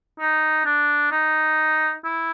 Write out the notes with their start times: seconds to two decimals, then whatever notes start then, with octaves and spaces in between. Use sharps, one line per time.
0.19 D#4
0.66 D4
1.11 D#4
2.04 E4